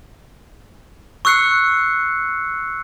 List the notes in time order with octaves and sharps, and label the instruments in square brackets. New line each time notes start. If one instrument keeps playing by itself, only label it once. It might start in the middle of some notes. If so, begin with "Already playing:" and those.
[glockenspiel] C#6 E6 F#6 C7 C#7